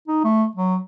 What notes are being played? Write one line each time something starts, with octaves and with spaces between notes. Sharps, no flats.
D#4
A3
F#3